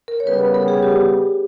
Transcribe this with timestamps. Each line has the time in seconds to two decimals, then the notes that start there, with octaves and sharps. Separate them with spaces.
0.08 A#4
0.20 C#5
0.26 C#3 G3 B3 B4
0.54 A#4
0.68 G#4
0.83 G4